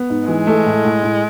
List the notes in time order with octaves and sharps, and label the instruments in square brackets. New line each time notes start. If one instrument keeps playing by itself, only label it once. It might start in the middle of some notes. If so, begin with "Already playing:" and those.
Already playing: [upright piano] B3
G#2
[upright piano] E3 [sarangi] G#3
[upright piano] A3
A2
A2
A2